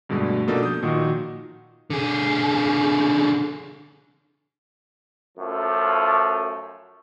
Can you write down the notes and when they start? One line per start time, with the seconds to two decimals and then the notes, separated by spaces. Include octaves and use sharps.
0.09 G2 B2 D3 G#3 A3
0.47 B2 F3 A#3 D4 D#4 A4
0.63 D#6 G6
0.83 A#2 D#3 F3 D#4 F#4
1.90 D3 G#4
5.38 F#2 F3 A3